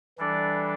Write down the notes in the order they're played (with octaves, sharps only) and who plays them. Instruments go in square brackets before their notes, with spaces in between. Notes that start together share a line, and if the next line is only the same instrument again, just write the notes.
[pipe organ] E3 G3 D4 A4 D5